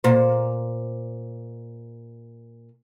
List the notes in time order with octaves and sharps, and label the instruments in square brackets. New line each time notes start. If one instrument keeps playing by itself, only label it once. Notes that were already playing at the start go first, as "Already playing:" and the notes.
[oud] A#2 C5